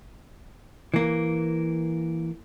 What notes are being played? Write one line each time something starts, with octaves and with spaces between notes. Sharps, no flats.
E3 A#3